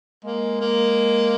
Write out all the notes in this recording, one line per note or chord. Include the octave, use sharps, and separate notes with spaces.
G#3 A#3
A#3